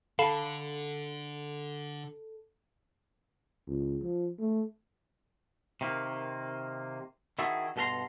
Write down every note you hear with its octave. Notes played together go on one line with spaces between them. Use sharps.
D3 A4 F5 A5 B5
C#2
F3
A3
C3 D#3 A#3
D#3 E4 F#4 G#4 A4
G2 B2 A4 A#4 A#5 C6